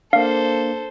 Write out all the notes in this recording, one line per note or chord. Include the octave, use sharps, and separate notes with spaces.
A#3 D4 A4 C5 F5